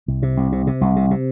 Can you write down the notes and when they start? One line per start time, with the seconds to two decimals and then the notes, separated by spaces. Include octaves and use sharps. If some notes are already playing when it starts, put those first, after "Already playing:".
0.08 C2
0.23 C3
0.37 C2
0.52 C3
0.67 C3
0.81 C2
0.96 C3
1.11 C3